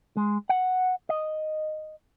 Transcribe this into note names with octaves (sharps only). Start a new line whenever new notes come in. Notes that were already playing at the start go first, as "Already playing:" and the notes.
G#3
F#5
D#5